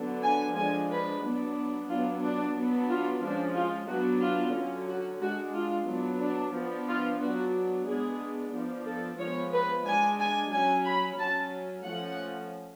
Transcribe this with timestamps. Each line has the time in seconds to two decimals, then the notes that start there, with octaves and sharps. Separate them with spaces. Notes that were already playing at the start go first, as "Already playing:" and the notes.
Already playing: D3 F#3 B3 D4
0.23 G#5
0.56 F3 G#3 D4 G#5
0.90 B4
1.23 F#3 B3 D4
1.89 F#3 B3 D4 F4
2.22 D4
2.56 F#3 B3 D4
2.89 F4
3.22 F3 G#3 C#4 D4
3.55 F4
3.88 F#3 B3 D4 F#4
4.22 F4
4.55 D3 F#3 C#4
4.88 F#4
5.21 G#3 D4 F#4
5.54 F4
5.88 F#3 B3 D4
6.21 D4
6.54 F3 B3 D4
6.87 F4
7.21 F#3 B3 D4 F#4
7.86 G#3 B3 D4 G#4
8.53 F3 B3 D4
8.86 A4
9.19 F3 G#3 B3 C#5
9.53 B4
9.86 G#3 D4 G#5
10.19 G#5
10.52 F#3 C#4 G#5
10.86 B5
11.19 F#3 C#4 A5
11.85 F3 A3 C#4 F#5